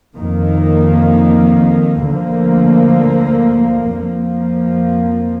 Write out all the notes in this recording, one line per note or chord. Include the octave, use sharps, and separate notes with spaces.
F2 D#3 A#3
D2 D3 F3 A#3
F2 F3 A#3